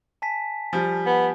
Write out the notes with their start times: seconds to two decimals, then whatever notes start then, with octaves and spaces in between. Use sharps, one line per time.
0.22 G#5 A5 B6
0.73 F3 G3 G#5
1.06 B3